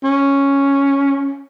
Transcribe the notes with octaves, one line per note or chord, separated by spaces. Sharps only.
C#4